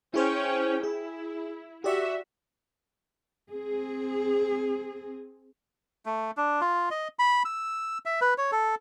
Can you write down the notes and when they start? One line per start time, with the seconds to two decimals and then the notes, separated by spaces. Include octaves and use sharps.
0.14 C#4 E4 G#4 C5 G5
0.83 E4 G#4
1.84 F#4 G4 D5 E5 C#6
3.51 C4 G#4
6.06 A3
6.37 D4
6.61 F4
6.91 D#5
7.19 B5
7.45 E6
8.05 E5
8.21 B4
8.38 C#5
8.52 A4